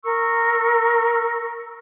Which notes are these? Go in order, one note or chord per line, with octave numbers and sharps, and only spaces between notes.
A#4 C#6 E6